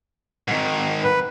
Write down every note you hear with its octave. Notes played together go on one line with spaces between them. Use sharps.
G#2 D#3
B4